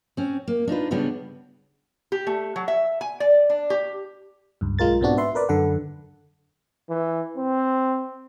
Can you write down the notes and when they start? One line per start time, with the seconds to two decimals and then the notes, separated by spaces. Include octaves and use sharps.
0.17 C4 C#4
0.48 A#3
0.67 D4 D#4 F4 B4
0.91 C#3 G3 B3 D4 B4
2.12 G4
2.27 A3
2.56 F#3
2.68 E5
3.01 G#5
3.20 D5
3.50 D4
3.70 G4
4.61 C#2 G2
4.79 B1 G#3 F4 A#4 A6
5.01 G#2 B2 B3 C4 D4 F#4
5.17 B4 E5 C6
5.35 A#4 B4 D5
5.49 F#2 D3 A4 F#5
6.90 E3
7.37 C4